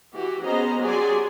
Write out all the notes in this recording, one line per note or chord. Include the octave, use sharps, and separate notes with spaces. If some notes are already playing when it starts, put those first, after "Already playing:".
E3 F#4 G4
B3 C#4 G#4 C5 D#5 A#5
F#3 G4 G#4 D5 G#5 C6